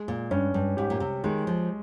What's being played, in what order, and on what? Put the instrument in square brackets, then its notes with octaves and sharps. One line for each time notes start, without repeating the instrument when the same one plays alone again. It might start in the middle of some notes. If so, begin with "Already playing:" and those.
Already playing: [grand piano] G#3
[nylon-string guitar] A#2
[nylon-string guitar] G2 [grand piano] C#4
[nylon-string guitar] G2
[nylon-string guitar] G#2 [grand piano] G4
[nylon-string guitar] A#2
C3
[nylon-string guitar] D#3 [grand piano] G#3
[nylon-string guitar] F3